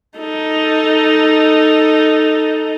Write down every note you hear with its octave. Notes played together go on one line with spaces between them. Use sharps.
D#4 A4